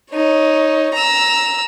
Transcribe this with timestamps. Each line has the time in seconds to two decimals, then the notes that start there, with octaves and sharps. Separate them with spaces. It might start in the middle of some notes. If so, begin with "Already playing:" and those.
0.11 D#4 C#5
0.93 A#5 E6